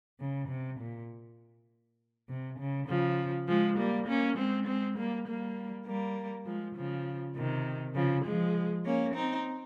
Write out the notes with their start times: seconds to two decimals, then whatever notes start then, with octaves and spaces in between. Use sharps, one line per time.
0.20 C#3
0.49 C3
0.80 A#2
2.29 C3
2.59 C#3
2.88 C#3 F3
3.47 F3 G#3
3.78 G3 A#3
4.07 A#3 C#4
4.37 G#3 C4
4.67 G#3 C4
4.97 G3 A#3
5.27 G3 A#3
5.87 G3 A#3
6.46 F3 G#3
6.76 C#3 F3
7.35 C3 D#3
7.95 C#3 F3
8.25 F3 G#3
8.85 A#3 C#4
9.14 C4 D#4